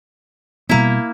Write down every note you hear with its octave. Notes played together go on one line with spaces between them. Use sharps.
B2 G3 A#3 B3 E4